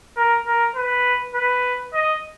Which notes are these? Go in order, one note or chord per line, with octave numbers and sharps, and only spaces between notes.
A#4
A#4
B4
B4
D#5